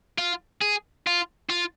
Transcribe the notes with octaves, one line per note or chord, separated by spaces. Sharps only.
F4
G#4
F4
F4